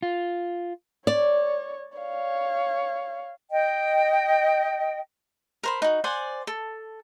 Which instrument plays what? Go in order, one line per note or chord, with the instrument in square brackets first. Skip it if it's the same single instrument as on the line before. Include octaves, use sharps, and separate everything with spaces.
[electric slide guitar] F4
[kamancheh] C#5 [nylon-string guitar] D5
[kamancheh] C#5 F5
[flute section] D#5 G5
[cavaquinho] A#4 C5 B5
D#4 F#4
C5 D5 F#5 G#5
A4